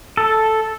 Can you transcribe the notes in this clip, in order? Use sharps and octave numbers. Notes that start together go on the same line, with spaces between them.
A4